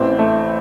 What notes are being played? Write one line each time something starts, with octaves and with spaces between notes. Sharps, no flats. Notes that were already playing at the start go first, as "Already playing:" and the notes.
Already playing: A1 A2 E3 C4
A3